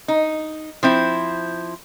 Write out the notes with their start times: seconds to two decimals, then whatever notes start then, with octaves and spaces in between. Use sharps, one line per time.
0.08 D#4
0.83 F3 C4 E4